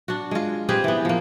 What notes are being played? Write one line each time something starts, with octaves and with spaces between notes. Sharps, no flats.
D4 F#4
G#3 F4
C4 G4 G#4 B4
E3 B3
F3 A#3